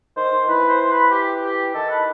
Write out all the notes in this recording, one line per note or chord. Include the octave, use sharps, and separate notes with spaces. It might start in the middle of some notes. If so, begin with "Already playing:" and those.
D#3 C5
D#3
E3 B4
C5
C5
B4
G4
G4
D#3 A4
B4